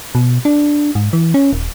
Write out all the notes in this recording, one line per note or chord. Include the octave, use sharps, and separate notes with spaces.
B2
D4
G#2
E3
C#4
D#1